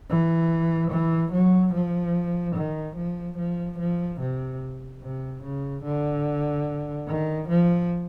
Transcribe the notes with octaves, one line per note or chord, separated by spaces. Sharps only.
E3
E3
F#3
F3
D#3
F3
F3
F3
C3
C3
C#3
D3
D#3
F3